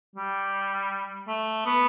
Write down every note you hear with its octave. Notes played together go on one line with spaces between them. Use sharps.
G3
A3
B3